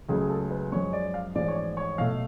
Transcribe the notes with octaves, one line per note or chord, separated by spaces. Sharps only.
C#2 C#3 F#3 A3 G#4
A4
B4
F#2 F3 G#3 C#5
D5
F5
A1 G#2 F3 G#3 D5
C#5
D5
C#5
B1 B2 F#3 A3 F5